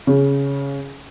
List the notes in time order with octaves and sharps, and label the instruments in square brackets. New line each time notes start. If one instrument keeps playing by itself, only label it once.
[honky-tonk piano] C#3